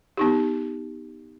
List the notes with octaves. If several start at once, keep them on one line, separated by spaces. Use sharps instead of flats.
B3 D#4 G4